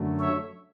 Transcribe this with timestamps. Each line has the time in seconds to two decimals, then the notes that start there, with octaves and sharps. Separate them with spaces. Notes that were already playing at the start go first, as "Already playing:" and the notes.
Already playing: F#2 D3 F#3 A3
0.20 C#5 E5